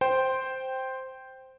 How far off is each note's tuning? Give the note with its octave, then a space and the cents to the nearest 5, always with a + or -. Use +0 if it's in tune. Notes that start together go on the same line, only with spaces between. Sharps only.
C5 +0 G5 -5